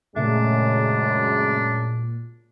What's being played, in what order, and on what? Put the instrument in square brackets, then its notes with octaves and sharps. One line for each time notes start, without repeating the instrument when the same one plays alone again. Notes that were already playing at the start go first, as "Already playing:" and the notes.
[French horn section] F#2 G#3 [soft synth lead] A#2 [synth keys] C#3 A3 [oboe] D4